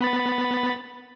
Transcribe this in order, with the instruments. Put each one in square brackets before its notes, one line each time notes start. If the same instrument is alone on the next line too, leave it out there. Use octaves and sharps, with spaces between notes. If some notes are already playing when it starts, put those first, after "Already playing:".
[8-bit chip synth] B3 B5 A6